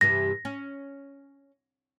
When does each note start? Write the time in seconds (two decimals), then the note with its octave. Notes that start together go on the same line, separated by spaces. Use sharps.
0.01 G2 C3 E3 A#6
0.45 C#4